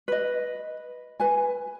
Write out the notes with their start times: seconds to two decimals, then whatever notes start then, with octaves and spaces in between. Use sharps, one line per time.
0.08 B4 D#5
1.20 B4 G#5